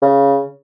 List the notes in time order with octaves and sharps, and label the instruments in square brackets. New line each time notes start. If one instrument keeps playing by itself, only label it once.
[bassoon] C#3